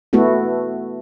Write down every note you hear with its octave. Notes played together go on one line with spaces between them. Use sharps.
A3 B3 E4 F#4 A4